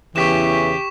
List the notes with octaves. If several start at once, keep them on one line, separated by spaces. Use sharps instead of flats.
E2 C#3 E3 G4 C#6 B6 E7